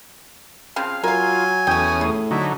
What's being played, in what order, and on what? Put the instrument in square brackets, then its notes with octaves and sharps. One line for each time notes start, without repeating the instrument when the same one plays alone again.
[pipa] C#3 F3 C4 [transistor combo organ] F5
[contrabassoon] F#3 [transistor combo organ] F4 [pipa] A#4 F5 [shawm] G#5
[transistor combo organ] E2 C#4 D#6 [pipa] A3 G5
[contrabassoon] A2 [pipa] G#4
[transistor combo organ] D3 F#3 D#4 [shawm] E4